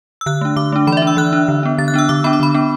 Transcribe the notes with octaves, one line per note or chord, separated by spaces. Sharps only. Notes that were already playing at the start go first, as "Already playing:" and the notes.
E6
D3 F#6
A3 D4
D3 D6
A3 D4
E3 B5
D5
E5
D4
E6
E3 F#6
D4
D3
B3 D4
D3 A6
F#6
B3 D4 E6
D3 D6
B3 D4 B5
D6
D3 B5
B3 D4